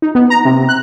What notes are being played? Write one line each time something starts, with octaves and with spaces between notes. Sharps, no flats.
D#4
B3
A#5
C3
F#6